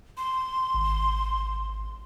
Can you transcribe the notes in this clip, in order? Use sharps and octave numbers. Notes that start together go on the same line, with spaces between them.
C6
G#1